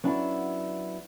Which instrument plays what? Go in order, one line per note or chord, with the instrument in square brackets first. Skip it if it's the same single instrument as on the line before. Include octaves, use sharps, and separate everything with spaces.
[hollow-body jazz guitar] F#3 B3 C#4 D4 E4